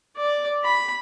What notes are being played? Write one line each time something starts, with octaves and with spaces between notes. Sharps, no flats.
D5
B5